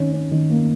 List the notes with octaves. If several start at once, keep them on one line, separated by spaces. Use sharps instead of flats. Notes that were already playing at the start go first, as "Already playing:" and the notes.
Already playing: D#3 C#4
C#4
D#3
A#3